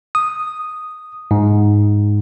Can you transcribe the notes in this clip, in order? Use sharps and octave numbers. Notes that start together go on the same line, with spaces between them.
D#6
G#2